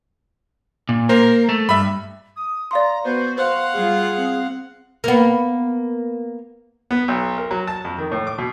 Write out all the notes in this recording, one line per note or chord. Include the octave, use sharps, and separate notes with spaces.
A#2
A#3 A#4 C5
A3
G2 E5 B5
D#6
D5 F5 A#5 C6
B3 F#4 C5
C5 F5 F#5 C6
G3 F4 G#4
C4
A#3 B3
B3
B1
A#4
F#3
A5
F2
D#3
A2
D6
B2